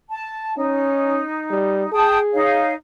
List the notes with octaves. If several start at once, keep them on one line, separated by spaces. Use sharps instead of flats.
A5
C#4 D#4
G3
G#4 G5 A5 D#6
D#4 C#5 F5